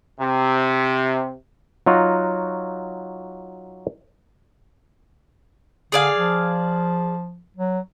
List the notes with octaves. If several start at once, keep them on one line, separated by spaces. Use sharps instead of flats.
C3
F#3 D#4 F4 F#4
D3 G#4 D5 F5
F3
F#3